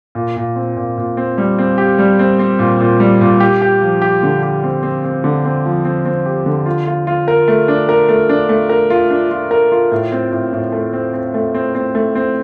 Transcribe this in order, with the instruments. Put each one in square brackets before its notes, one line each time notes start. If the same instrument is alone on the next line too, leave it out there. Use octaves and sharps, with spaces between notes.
[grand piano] A#2
A#2
C4
A#2
A#2
C4
G3
C4
G4
G3
C4
C4
A#2
A#2
G3
A#2
G4
G4
F3
G4
D3
G4
C4
C4
C4
D3
C4
F3
C4
C4
G4
D3
F4
F4
F4
A#4
A3
D4
A#4
A3
D4
A3
A#4
F4
D4
F4
A#4
F4
A2
C4
A2
A2
A3
C4
C4
A3
C4
C4
A3
C4